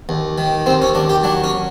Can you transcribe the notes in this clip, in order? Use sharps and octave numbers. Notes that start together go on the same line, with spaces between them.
D#2
D#3
D#2 C4
C#4
D#2 D4
G4
F#3 D4
C#4